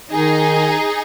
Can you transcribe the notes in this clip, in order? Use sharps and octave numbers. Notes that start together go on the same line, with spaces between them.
D#3 D#4 G#4